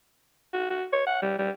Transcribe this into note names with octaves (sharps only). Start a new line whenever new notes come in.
F#4
F#4
C#5
F#5
G3
G3